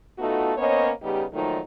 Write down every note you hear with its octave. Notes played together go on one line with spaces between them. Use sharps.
A3 B3 D#4 F4 F#4 A4
A#3 B3 C#4 C5 C#5 D#5
C#3 G3 B3 D#4 G4
A#2 D#3 F3 F#3 A3 D#4